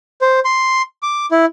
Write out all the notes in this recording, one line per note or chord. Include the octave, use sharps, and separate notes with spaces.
C5
C6
D6
E4